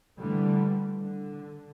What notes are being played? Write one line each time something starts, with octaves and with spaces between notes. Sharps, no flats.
D3 E3 G3 A3
D3